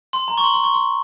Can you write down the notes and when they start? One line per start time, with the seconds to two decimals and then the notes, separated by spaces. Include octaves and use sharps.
0.13 C6
0.28 A#5
0.37 C#6
0.44 C6
0.54 C6
0.64 C#6
0.74 C6